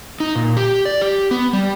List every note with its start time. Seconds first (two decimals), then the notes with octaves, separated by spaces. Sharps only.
0.20 D#4
0.36 A#2
0.57 G4
0.85 D5
1.01 G4
1.31 B3
1.53 G3